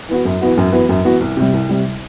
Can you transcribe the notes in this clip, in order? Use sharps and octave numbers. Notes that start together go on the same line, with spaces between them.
E3 B3 F#4
F#2
E3 B3 F#4
F#2
E3 B3 F#4
F#2
E3 B3 F#4
C2
C3 G3
C2
C3 G3